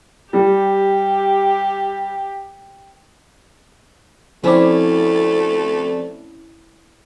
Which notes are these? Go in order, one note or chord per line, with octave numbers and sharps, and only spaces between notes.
G3 G4
F3 A3 C4 C#4 E4 D5